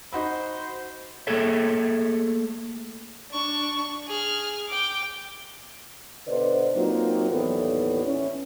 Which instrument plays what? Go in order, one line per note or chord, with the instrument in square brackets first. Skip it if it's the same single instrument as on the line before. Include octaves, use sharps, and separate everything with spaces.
[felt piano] D#4 F#4 B5 [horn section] C5
[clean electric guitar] A3 A#3 G#4 A4 C#5 E5
[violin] D4 C#6
G#4 F6
G5 D6
[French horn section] B2 D3 B4 C5 D5 D#5
F#3 A#3 C4 D#4 F4
D#2 A2 E3 B3 A4 D5
C#4 E4